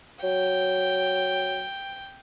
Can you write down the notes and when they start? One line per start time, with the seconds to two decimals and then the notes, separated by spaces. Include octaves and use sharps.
0.23 F#3 G5